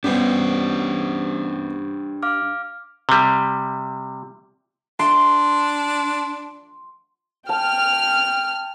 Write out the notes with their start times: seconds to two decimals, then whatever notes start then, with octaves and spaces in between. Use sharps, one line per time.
0.04 G2 B2 C#4 D4 G4 C5
2.23 F5 D6 F6
3.09 C3 G3
4.99 D4 C6
7.49 G5 A5 F6